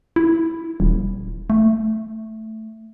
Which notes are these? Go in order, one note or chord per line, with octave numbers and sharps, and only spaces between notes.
E4
D#1
A3